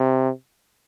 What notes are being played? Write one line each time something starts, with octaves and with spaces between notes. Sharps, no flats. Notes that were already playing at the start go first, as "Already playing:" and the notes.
Already playing: C3